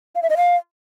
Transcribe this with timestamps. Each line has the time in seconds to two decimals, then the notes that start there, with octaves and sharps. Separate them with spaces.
0.15 F5
0.23 E5
0.30 D#5
0.37 F5